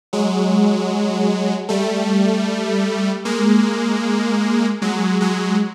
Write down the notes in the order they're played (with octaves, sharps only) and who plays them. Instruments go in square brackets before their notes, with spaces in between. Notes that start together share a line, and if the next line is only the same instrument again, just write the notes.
[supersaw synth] F#3 G#3
G3 A3
G#3 A#3
F#3 G#3
F#3 G#3